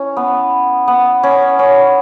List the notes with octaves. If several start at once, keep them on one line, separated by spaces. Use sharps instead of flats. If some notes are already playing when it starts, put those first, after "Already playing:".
Already playing: C#4 E4
B3
B3
C#4
C#4